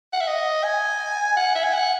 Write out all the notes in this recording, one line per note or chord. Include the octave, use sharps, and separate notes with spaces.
F#5
E5
D#5
G#5
F#5
E5
G#5
F#5